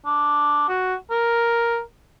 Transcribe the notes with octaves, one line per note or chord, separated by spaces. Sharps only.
D4
F#4
A#4